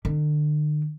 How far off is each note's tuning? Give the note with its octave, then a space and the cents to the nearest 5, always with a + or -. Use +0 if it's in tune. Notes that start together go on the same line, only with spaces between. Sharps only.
D3 +40